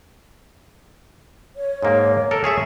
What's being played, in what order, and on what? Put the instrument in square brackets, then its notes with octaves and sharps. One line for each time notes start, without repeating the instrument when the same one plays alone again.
[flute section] C#5
[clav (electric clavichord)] G#2 A#3
A4 A#4
G#4 C#5 E5